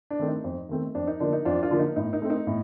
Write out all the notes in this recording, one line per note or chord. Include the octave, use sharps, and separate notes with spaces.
D4
D#3 A3 C4
D#4
F2
D#3 A3 C4
F2 D4
D#4
D3 F3 A#3 D4
D#4
F2 D4 F4
D4 F4
D3 F3 A#3
D#4
A2 D#4
D#4
A3 C4
D#4
A2